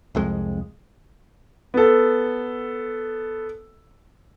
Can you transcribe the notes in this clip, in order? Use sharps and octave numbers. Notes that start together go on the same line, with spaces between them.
C2 F2 G#3
B3 A4